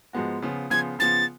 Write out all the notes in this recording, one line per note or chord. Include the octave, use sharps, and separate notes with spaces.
G#2 F3 G#3 B3 F#4
C#3 F3 B3 F4
C#3 F3 B3 F4 G#6
C#3 F3 B3 F4 A6